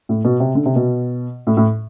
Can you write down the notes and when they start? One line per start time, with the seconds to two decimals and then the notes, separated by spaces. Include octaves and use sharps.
0.09 A2
0.25 B2
0.40 C3
0.55 D3
0.66 C3
0.76 B2
1.47 A2
1.57 A2